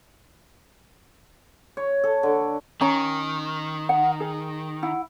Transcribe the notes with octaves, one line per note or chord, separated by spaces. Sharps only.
C#5
A4
D3
D#3 C#4 A#5
F#5
G#4
E4 F#5